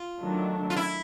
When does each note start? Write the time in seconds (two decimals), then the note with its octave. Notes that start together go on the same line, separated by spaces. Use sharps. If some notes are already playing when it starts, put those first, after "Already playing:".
Already playing: F4
0.20 D#3 F#3 A3 D4
0.70 F4
0.76 E4